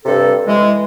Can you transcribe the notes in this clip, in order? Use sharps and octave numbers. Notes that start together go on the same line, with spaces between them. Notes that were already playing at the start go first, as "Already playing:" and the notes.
G2 C3 A4
E3 G#3